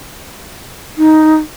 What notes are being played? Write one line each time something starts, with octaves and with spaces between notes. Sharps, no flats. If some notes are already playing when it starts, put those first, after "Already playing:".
D#4